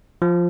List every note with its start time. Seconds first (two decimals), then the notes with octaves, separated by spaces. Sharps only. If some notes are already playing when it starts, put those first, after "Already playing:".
0.22 F3